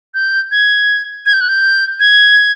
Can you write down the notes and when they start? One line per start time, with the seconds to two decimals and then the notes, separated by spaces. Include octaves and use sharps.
0.14 G6
0.51 G#6
1.26 G#6
1.33 G6
1.41 F#6
1.49 G6
2.00 G#6